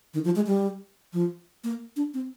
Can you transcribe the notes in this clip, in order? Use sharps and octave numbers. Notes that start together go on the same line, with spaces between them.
D#3
F3
G#3
G3
F3
A#3
D4
C4